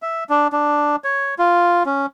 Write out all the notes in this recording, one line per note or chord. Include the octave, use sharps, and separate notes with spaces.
E5
D4
D4
C#5
F4
C#4